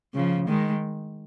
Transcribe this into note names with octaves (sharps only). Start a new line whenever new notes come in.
C#3 F3
D#3 G#3